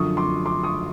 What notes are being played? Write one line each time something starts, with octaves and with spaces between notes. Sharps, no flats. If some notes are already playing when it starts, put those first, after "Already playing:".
Already playing: F#2 D3 F3 C#6 D#6
C6 D6
C6 D6
C#6 D#6